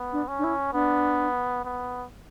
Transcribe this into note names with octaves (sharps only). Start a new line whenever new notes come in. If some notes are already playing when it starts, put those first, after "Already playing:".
Already playing: B3
D4
C#4
D4
E4
B3 D4
B3